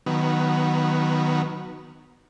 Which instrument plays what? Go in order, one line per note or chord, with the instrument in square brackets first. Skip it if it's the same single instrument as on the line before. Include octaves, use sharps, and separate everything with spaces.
[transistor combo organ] D#3 F#3 B3